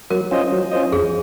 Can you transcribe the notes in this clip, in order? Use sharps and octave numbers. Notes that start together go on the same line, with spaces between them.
F#3 A#4
C#4 F4 C5 D#5
F#3
C#4 F4 C5 D#5
F2 G#4